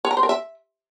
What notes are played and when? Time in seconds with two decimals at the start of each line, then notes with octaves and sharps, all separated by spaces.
0.05 C#5
0.11 A#5
0.17 C5
0.23 A#4
0.29 E5